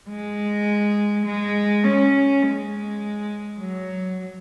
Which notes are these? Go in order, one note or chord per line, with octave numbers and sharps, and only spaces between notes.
G#3
G#3
C#4
G#3
F#3